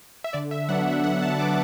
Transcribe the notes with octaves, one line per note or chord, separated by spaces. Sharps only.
E5
D3 D5
E5
F#3 B3 D4 F#5
E5
D3 F#5
A5
F#3 B3 D4 D6